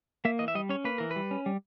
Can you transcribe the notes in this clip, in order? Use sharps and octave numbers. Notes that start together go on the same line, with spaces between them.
A#3 E5
E3 D#5
E5
G3 D#5
C#4 C#5
A#3 B4
E3 A#4
B4
G3
C#4
G3